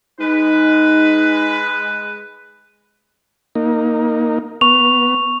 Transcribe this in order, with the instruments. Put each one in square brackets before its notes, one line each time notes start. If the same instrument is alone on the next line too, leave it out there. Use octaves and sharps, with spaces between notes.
[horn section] G#3 B4 [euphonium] D#4
[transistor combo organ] A#3 D#4
[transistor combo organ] B3 [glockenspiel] C#6 F7